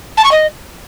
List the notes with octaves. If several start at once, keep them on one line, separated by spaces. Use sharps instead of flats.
A5
C#6
D#5